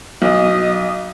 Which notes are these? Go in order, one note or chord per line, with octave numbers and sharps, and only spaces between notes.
B1 D#5